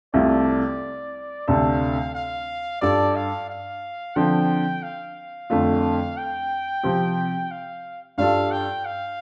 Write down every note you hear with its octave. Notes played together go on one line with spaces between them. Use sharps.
C2 C3 A3 F4 A4 D5
D2 C3 A3 D4 A4 F5
F5
G2 G3 F4 A4 D5
F5
F5
D3 F3 C4 G5
F5
F2 D3 A3 F4
G5
C3 F3 C4 G4
F5
G2 G3 F4 A4 F5
G5
F5